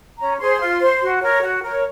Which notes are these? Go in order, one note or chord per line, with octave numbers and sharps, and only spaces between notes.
C#4 A#5
G#4 C5 C6
F4
C5
F#4
A#4 C#5
F#4
A#4 C#5